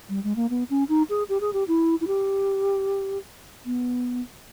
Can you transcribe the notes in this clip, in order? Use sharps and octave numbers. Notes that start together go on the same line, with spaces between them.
G3
G#3
A#3
B3
C#4
D#4
G#4
G4
G#4
G4
E4
E4
G4
B3